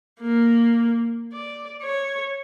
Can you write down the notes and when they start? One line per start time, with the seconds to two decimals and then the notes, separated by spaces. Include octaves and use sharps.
0.21 A#3
1.32 D5
1.83 C#5